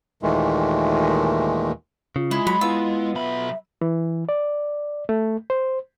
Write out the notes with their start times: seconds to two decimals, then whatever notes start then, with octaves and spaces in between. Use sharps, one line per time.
0.23 D#2 A#2 D#3 E3 G#3 A3
2.16 C#3 F4
2.31 G#3 E4
2.47 F#3 B5
2.61 B3 E4 F4 E6
3.15 B1 E5 B5
3.81 E3
4.29 D5
5.09 A3
5.50 C5